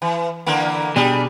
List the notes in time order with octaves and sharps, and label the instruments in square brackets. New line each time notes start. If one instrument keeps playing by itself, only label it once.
[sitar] E3
D3 E3 A#3
[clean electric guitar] B2 D4 G#4 [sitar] G3